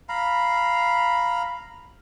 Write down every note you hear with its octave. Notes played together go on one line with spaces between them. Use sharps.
F5 A#5 B5